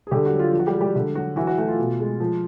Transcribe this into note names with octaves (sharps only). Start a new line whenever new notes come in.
G#4
D3 G3 G4
F#4
F#3
F4
F3
F#4
G3 G4
G#3
G3 G4
D3 F#4
F#3 F#4
E3 F#4
F#4
A3 F#4
F4
B2
G#3
F3